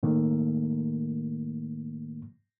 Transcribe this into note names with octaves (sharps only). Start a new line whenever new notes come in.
A2 D#3 A3 A#3